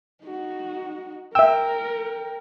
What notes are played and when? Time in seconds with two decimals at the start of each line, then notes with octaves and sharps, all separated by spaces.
0.24 D#4 F#4
1.35 A#4 E5 G5 E6